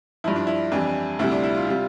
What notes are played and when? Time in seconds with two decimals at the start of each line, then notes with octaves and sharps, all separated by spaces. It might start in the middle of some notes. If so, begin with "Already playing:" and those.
0.24 G2 F3 E4
0.36 D4
0.47 E4
0.72 F2 E3 G3 D4
1.19 D2 C3 G3 E4
1.31 D4
1.44 E4
1.55 F4
1.67 C3 G3 F4